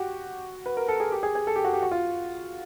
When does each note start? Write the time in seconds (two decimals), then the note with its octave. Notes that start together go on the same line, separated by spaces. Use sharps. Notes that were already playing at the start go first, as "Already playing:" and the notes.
Already playing: F#4 G4
0.66 B4
0.77 A#4
0.88 A4
1.00 G#4
1.12 G4
1.23 G#4
1.35 G#4
1.47 A4
1.56 G4
1.64 F#4
1.73 G4
1.83 F#4
1.91 F4